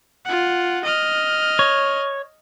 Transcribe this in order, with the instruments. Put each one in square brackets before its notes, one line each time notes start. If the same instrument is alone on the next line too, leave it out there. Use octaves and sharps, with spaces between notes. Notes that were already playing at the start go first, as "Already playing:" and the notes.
[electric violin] F4 F#5
D#5 F6
[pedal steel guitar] C#5